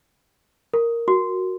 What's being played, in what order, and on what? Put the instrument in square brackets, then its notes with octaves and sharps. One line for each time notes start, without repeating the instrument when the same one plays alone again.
[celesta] A#4
[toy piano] F#4